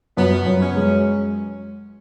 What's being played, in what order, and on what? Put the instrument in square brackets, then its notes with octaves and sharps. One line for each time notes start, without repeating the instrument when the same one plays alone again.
[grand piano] F#2 [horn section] B3
[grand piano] F#2
[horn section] C#4
[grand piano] G#3